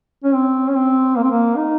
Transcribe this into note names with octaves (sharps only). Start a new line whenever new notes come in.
C#4
C4
C#4
C4
A#3
C4
A#3
D#4